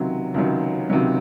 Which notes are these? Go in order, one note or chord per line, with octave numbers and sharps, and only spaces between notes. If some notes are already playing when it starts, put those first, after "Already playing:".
Already playing: C#2 C3 D#3 F#3
C#2 C3 D#3 F#3
C#2 C3 D#3 F#3